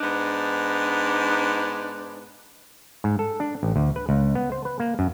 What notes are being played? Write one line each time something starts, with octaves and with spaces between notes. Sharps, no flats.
G#2 B3 D4 D#4
G#2
A4
D4
A1
D2
B4
C#2
B3
C5
B4
A#3
F#2